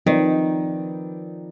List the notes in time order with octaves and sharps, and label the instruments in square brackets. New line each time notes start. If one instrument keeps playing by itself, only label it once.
[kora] D#3 [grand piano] F3 C4 D#4 B4 D5